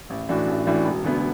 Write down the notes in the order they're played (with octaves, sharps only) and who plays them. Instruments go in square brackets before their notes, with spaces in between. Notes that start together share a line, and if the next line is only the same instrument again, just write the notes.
[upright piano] A1
A2 E3 D4 F#4
A1
A2 E3 D4 F#4
E1
D2 D3 B3